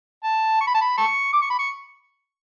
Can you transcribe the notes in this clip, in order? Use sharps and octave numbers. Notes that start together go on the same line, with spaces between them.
A5
C#6
B5
A5
B5
A5 C#6
D6
C#6
B5
C#6